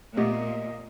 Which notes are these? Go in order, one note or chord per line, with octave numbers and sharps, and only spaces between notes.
A#2 A3 B3 G4 D#5